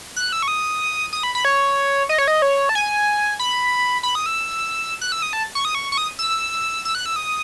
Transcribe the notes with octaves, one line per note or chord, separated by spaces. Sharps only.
F#6
E6
C#6
D#6
D#6
B5
B5
C#5
D#5
C#5
D#5
C#5
A5
G#5
B5
B5
D#6
E6
F#6
E6
D#6
A5
C#6
D#6
C#6
C#6
D#6
E6
E6
F#6
E6
D#6